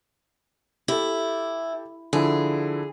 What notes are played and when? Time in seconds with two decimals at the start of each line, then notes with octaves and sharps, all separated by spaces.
0.88 E4 G4 A4
2.13 D3 F3 E4 G#4